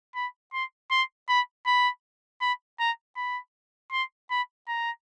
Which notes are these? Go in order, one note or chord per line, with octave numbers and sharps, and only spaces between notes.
B5
C6
C6
B5
B5
B5
A#5
B5
C6
B5
A#5